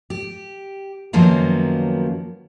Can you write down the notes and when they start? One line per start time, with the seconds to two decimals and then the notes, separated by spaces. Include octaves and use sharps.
0.10 G4
1.13 F#2 D#3 F3 F#3 A#3 B3